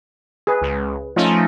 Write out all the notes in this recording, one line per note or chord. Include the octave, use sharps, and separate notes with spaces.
G#4 B4
C#2
F3 A3 C#4 D#4 F4